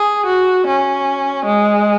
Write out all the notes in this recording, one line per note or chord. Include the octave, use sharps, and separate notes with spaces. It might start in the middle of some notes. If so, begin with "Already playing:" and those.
Already playing: G#4
F#4
C#4
G#3